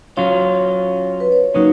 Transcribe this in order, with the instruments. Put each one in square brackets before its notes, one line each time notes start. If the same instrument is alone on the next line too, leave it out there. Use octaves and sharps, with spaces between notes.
[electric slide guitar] F#3 C#4 F4 [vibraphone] C#5
[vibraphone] B4
C#5
C#5
[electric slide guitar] F#3 A#3 C#4 [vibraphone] D#4